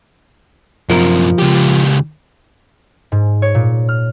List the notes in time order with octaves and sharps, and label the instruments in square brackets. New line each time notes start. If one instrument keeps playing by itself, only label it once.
[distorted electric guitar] F#2 C3 [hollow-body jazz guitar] F3 A#4
[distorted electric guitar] C#2 G4
[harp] G#2
C#5
A#2
F6